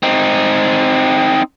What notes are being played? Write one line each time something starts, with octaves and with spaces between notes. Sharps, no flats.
C4 D#4